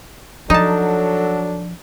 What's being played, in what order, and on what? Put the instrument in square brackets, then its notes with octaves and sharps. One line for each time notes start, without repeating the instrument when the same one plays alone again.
[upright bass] F3 [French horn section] F#3 A4 [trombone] D4 [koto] D#4 A5